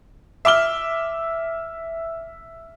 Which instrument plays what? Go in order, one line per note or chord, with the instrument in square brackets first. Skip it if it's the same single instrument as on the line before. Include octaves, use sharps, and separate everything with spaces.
[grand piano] E5 D6 F6 G7